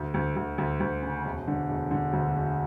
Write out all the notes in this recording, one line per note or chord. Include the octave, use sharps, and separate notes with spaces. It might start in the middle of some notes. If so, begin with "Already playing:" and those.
Already playing: D2
D2
D2
D2
D2
C#3
E1
D3
E1
D3
D2
E1